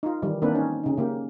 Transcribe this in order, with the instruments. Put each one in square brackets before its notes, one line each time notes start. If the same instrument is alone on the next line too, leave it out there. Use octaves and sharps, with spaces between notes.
[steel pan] D#4 F4
D#3 E3 G3
D#3 A#3 C4 D4 B4
C#4 D#4
C#3 D#4
C#3 A#3 G4